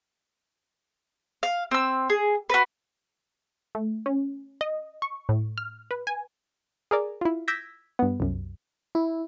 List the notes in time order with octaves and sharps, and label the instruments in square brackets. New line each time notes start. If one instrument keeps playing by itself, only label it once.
[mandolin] F5
C4 E6
G#4
F#4 B4
[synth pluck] A3
C#4
D#5
C#6
A2
F6
B4
G#5
G#4 A#4 D5
E4 F4
D6 E6 G6 G#6 A#6 B6
G2 B3
C2 F#2
[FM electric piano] E4